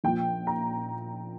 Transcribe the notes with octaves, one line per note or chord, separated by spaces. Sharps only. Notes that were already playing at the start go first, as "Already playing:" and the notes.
A#1 A#2 F3 G5
A#5